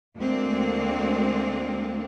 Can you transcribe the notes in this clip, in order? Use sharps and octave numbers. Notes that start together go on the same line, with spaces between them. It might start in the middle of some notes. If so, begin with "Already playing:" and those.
D2 G#3 A#3 C4 D4